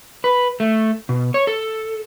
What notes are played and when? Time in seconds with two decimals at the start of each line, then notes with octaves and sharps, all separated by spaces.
0.24 B4
0.60 A3
1.09 B2
1.34 C#5
1.47 A4